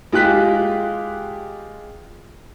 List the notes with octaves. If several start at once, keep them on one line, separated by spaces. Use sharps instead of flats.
G#3 F4 G4 F#6 B6